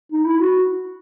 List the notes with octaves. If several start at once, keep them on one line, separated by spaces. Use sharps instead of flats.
D#4
E4
F#4